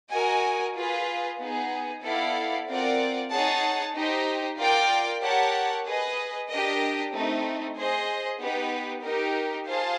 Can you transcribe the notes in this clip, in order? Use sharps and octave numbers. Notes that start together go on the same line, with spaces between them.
F#4 A#4 D#5 G#5
F4 G#4 B4
B3 D#4 G#4
B3 E4 A4 D5 F5
C4 F4 A#4 D5 F#5
D#4 G#4 C#5 F#5 A5
D#4 G4 C5 D#5
F4 A#4 D5 G5
G4 A#4 C#5 F#5 A5
G#4 B4 D#5
D4 G4 A#4 D#5
A3 C4 D#4
G#4 C5 D#5
B3 D#4 G4 B4
D#4 G4 A#4
F4 G#4 C5 F5 A5